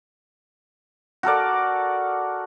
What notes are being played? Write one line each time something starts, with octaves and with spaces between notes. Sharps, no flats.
F#4 A4 A#4 D5